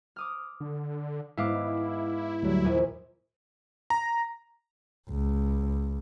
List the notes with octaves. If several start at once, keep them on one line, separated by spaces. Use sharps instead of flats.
D6 D#6 F6
D3
G#2 G#3 B3 E4 E5 F5 D6
D2 F#3 G3
A#1 D#2 G#5
A#5
C#2